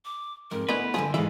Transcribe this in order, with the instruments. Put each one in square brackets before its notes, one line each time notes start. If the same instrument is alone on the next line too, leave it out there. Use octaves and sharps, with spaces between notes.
[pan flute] D6
[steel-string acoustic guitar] F2 G#2 F3 [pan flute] A#4
[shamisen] D3 C#4 D#4 [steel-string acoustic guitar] A3 B3 E4 [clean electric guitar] B4
[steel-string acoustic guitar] D3 G3 E4 [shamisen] F3 G#4 [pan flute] G#5
[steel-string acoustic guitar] D#2 D5 F5 [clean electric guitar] G#2 E3 [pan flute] G#4 [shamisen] E5